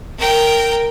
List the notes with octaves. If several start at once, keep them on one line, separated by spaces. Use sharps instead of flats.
A#4 G5